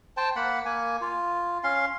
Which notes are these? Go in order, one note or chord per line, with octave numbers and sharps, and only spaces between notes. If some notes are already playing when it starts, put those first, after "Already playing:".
C5 G5 A5
A#3 F#5 B5
A#3 G#5
F4
C#4 F5 C6